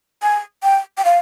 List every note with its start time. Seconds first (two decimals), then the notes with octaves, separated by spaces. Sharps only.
0.22 G#5
0.63 G5
0.98 G5
1.05 F5